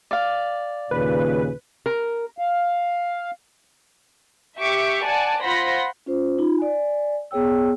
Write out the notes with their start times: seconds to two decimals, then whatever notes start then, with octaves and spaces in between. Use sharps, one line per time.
0.11 D5 F5
0.91 D#2 A#2 C#3 B4
1.86 A#4
2.38 F5
4.59 G4 E5 C#6 D6
5.04 D5 F#5 G#5 A5
5.40 F4 C5 F#5 B5 C6 A#6
6.06 C#4 F4 C5
6.38 D#4 F4
6.58 D5 G#5
7.31 B3 G#4 C#5 G5 E6